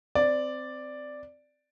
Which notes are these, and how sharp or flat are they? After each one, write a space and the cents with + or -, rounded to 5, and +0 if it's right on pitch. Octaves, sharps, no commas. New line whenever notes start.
C4 -15 D5 +0